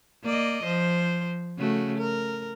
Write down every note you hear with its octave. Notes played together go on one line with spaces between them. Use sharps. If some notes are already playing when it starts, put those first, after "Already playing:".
A#3 D5 D#5
F3 C5
C#3 A3 F#4
A#4